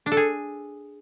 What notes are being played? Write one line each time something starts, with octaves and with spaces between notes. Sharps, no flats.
D4
A4
G#4